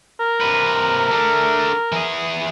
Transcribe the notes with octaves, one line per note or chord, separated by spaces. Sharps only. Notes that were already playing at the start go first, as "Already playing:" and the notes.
A#4
C3 B4
A3 D4
E3 G#4